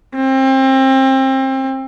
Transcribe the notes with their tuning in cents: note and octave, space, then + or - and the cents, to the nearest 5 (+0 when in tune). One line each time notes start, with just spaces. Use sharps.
C4 +30